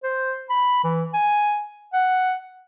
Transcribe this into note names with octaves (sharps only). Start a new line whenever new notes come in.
C5
B5
E3
G#5
F#5